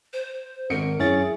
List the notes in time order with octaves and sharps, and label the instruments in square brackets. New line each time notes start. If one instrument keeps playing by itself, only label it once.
[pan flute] C5
[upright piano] G#1 C#7 D7 [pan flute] A#4
[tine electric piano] F#2 C#4 A6 [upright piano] E4 [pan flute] G#4